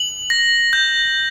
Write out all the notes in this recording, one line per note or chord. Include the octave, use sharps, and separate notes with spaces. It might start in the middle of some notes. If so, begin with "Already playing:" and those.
Already playing: F#7
A#6
G6